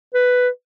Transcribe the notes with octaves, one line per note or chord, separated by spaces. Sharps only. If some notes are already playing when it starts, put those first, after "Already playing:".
B4